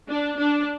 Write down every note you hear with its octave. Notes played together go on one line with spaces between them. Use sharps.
D4
D4